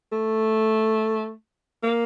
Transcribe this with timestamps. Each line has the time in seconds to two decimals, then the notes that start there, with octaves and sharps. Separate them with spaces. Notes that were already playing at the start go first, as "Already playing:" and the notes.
0.12 A3
1.83 A#3